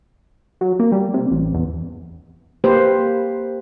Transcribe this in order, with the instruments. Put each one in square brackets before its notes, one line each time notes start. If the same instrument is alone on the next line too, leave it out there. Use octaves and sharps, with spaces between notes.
[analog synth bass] F#3
A#3
G3
C3
A1
E2
[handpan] A#3 G4 B4 C5